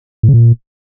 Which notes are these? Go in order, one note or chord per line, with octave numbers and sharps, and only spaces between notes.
A2
C#3
A#2